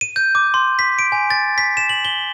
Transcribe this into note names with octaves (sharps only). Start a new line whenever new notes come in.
D#7
G6
D6
C6
B6
D7
G#5
A6
B6
E7
F#7
G7